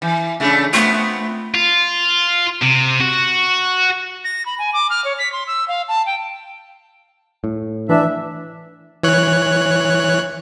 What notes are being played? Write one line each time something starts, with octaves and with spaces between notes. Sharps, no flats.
E3
C#3 A3 D4
A3 B3 C4 F4
F4
C3
F#4
A#6
B5
G#5
D6
F6
C#5
B6
C6
E6
F5
A5
G5
A2
E3 D4 E5
E3 C#5 F#6